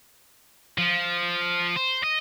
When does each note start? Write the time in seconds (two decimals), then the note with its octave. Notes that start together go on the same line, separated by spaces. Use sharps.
0.78 F3
1.76 C5
2.03 D#5